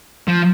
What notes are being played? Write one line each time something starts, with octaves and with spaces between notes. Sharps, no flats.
F3